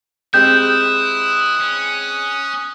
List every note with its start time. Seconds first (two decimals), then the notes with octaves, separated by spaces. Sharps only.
0.34 G#3 C4 E4 G4 D#6 F#6 G6
1.61 C#4